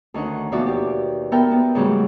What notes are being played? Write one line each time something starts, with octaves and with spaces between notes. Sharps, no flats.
D2 D#3 C#4 F#5
D#2 B2 F3 F#4 D5 E5
G4
B3 A4 A#4 E5 G5
B3
G#2 C#3 E3 F#3 G3 A3